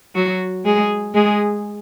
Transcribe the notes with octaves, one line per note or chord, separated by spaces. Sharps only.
F#3 F#4
G#3 G#4
G#3 G#4